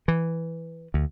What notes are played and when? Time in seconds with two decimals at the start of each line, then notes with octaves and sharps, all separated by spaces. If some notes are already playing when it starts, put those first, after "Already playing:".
0.08 E3
0.94 D2